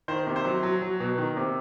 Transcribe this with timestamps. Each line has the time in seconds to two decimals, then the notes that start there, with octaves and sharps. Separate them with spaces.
0.08 D#3 C5
0.27 C3
0.36 C5
0.45 F#3
0.63 F#3
0.82 F#3
1.00 B2
1.18 D#3
1.37 C3